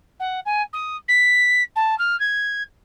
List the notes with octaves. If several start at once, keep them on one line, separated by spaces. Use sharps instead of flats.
F#5
G#5
D#6
B6
A5
F6
G#6